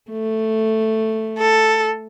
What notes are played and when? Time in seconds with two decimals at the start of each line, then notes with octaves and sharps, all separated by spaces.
0.11 A3
1.39 A4